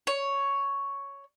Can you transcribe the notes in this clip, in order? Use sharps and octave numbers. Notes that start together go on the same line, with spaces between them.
C#5